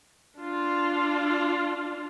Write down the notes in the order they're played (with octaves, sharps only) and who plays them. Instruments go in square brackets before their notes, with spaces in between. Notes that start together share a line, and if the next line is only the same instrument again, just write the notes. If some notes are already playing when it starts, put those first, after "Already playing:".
[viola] D4 F4